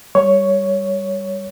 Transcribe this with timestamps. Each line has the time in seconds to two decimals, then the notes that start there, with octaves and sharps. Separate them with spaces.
0.15 G3 C#5 C#6